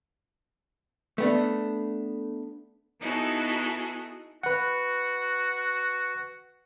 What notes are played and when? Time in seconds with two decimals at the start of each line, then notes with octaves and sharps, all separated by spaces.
1.18 A3 B3 D4
3.00 B3 D#4 E4 F#4 G#4 A4
4.43 F#4 B4 F#5